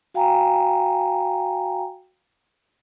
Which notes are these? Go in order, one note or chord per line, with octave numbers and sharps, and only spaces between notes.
F#4 F5 G5 G#5 A#5